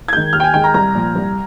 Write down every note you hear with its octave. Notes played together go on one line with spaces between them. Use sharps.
G#6
D#3 G#3 G6
D#2 F6
G5
G#5
D#3 G#3 G5
A#5
C2 A#5
A#2 F3
C2